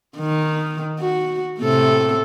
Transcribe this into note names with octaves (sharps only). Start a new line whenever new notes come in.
D#3
F#4
A2 C3 A4